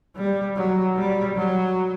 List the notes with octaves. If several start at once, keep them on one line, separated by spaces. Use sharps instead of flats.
G3
F#3
G3
F#3